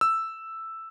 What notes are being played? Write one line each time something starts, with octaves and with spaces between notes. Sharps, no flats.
E6